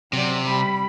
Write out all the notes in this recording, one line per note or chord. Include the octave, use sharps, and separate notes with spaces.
C3 F#3 D5
G3 B5